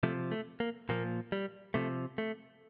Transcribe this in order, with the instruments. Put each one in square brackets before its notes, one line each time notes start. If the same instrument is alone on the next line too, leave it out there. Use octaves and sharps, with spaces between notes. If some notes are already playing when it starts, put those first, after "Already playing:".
[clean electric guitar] C3 F3 A3
A3
A#3
A#2 F3 A#3
G3
C3 F3 A3
A3